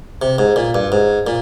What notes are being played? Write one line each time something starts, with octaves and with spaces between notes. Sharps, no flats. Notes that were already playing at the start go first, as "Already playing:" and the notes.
C3
G#2
A#2
G2
G#2
A#2